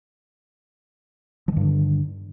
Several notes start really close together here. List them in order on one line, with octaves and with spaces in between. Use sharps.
F3 D#3 G2 D3